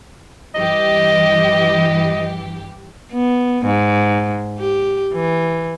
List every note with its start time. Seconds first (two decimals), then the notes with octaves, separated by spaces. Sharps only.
0.55 G2 E3 G4 D#5
3.13 B3
3.66 G#2
4.59 G4
5.14 E3